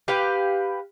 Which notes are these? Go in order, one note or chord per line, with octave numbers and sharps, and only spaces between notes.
G4 B4 F5